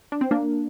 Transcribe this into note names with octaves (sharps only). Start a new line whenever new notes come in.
D4
C4
A#3 D4